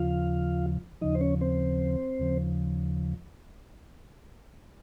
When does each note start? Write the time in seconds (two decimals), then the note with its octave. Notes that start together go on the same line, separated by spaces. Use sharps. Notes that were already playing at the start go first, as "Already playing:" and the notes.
Already playing: D#2 C#3 F3 F4 F5
1.01 D#2 C#3 F3 D#4 D#5
1.15 C5
1.21 C#4 C#5
1.41 C4 C5
2.19 D#2 C#3 F3